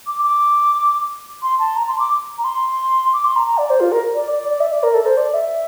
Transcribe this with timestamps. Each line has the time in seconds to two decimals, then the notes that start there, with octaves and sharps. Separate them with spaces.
0.07 D6
0.23 D6
1.43 C6
1.59 A5
1.76 A#5
1.88 C6
1.99 D6
2.38 A#5
2.44 C6
3.13 D6
3.25 C6
3.36 A#5
3.47 A#5
3.58 D5
3.70 C5
3.80 F4
3.92 A#4
4.14 D5
4.31 D5
4.50 D5
4.60 E5
4.72 D5
4.83 A#4
4.94 A4
5.06 C5
5.17 D5
5.34 E5